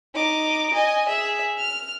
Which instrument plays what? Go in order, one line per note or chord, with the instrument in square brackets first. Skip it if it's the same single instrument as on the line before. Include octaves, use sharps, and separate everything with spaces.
[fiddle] D#4 D6
D#5 G#5
G#4 E5
F6